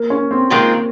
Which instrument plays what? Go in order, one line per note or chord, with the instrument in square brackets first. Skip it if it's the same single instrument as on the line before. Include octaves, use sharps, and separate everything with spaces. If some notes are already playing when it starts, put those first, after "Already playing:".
Already playing: [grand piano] A#3
C#4
C4
[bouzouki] D#3 G#3 C4 F4 [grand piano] A#3